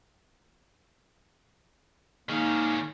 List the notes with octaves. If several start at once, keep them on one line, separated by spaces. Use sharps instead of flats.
D#3 G#3 A#3 C#4 D#4